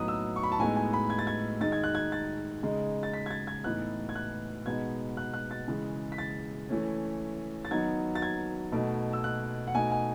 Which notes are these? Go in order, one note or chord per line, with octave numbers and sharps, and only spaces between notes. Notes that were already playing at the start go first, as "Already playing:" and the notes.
Already playing: A2 F#3 B3 D#4 D#6 F#6
E6
C#6
B5
A5
A2 G#3 B3 D#4 G#5
G#5
B5
G#6
A6
G#6
D#3 G#3 D#4 A6
G#6
F#6
G#6
A6
C#3 G#3 D#4
A6
B6
G#6
A6
G#6
A2 E3 B3 D#4 F#6
G#6
F#6
B2 G#3 B3 D#4 G#6
F#6
F#6
A6
C#3 E3 G#3
B6
A6
E3 A3 C#4
A6
D#3 F#3 B3 D#4 G#6
A6
G#6
B2 A3 D#4
E6
F#6
F#5
B2 A3 D#4 G#5
G#5